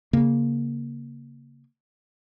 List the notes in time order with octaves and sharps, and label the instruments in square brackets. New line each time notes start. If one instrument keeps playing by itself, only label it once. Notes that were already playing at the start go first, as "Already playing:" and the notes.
[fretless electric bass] C#3 A#3